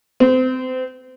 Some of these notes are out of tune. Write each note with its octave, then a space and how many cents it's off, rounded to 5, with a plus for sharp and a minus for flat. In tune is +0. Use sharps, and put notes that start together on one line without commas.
C4 -30